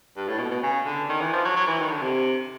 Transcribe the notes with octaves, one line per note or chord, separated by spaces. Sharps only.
G2
A2
B2
B2
C#3
D3
D#3
E3
F3
F#3
F#3
E3
D#3
D3
C3